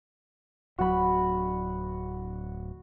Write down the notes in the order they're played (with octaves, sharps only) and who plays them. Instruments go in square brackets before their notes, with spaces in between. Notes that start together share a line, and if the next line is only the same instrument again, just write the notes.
[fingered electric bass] D1 F#3 [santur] F#4 B5